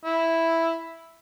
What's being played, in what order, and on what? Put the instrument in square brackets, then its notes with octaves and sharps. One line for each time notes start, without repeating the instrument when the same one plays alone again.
[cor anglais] E4